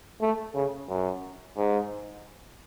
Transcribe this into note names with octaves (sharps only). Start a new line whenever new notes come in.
A3
C#3
F#2
G#2